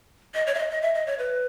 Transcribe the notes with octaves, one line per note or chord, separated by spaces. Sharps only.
D#5
C#5
E5
D#5
D#5
E5
D#5
C#5
B4